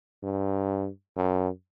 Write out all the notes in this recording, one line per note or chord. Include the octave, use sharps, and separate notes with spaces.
G2
F#2